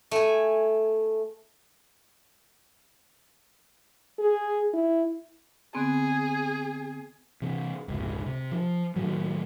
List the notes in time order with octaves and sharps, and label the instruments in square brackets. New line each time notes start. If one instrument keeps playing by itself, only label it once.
[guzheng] A3 G#5
[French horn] G#4
E4
[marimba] D3 B3 C4 [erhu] G#4
[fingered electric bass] C3 E3
F1 C#2 G#2
C3
F3
A2 D#3 F#3